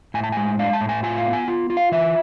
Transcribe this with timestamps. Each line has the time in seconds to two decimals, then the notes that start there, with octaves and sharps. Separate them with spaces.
0.14 A2 G#5
0.24 A5
0.32 G#3 G#5
0.59 D4 F5
0.73 A5
0.81 A2
0.89 G#5
1.03 F4 G#5
1.18 F5
1.26 B3
1.33 G#5
1.48 F4
1.70 F4
1.77 F5
1.92 E3 E5